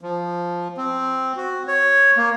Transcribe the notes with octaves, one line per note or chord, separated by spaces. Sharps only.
F3
C4
F#4
C#5
A#3